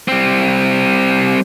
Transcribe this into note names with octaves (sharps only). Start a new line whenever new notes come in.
G3 C4